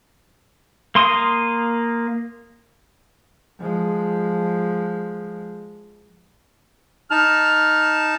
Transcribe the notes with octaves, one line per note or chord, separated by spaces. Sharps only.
A#3 C6 D#6
F3 G#3
D#4 A5 F6